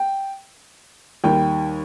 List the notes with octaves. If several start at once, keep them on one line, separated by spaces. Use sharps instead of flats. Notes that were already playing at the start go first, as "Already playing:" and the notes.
Already playing: G5
D#2 D#3 G3 G5